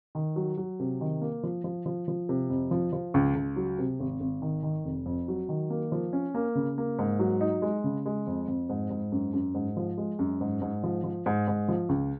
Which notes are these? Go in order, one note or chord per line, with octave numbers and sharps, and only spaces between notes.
D#3
F#3
F#3
C3
D#3
A#3
F3
F3
F3
F3
C3
F2
F3
F3
C#2
C#2
F#3
C3
G#1
G#1
D#3
D#3
F1
F2
F#3
D#3
A#3
F3
C#4
A#3
C#3
A#3
G#2
F#3
D#4
G#3
C#3
G#3
F2
F2
G#2
G#2
F#2
F#2
G#2
F3
G#3
F#2
G#2
G#2
F3
F3
G#2
G#2
F3
C#2